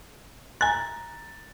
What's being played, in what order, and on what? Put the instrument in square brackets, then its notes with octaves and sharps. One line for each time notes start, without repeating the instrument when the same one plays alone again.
[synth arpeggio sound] G#5 F#6 [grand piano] A#5 A6